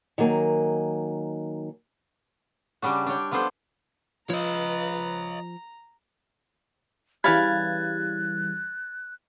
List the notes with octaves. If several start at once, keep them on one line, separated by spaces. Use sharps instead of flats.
D#3 F#3 A#3 G#5
C#3 G3 D4 F#4
D4 C#5 G5
F3 B3 D4 A4 C5
F3 B4 C#5 D#5 A#5
C#3 E3 G3 F5 B5 F#6 G#6 A6